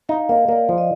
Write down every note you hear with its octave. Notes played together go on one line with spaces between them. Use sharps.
D#4 F5
A#3 D#5
A#3 D5
F3
D#5